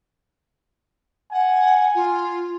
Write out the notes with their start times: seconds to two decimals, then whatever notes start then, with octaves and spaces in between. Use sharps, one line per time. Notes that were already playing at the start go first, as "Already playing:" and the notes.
1.32 F#5 G#5
1.95 F4